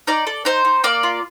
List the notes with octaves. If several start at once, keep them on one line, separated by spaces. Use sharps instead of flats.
D#4 D5
A4
D#4 C5
D#4
A#3 D5
F4